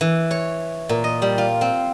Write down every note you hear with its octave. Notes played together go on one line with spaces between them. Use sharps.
E3
C#5
A#2
D#5
G3
F4
C4